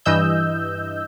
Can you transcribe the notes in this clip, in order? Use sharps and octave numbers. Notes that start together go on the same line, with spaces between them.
G2 E3 D#5 E6 G6